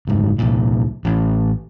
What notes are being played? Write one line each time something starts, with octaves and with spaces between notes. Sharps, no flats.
F#1 G#2
C2 A#2
A1